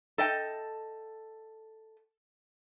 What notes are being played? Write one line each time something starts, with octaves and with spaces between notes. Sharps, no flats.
A4 D#5 G5